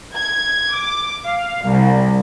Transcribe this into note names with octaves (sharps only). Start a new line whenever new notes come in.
G#6
D6
F5
C2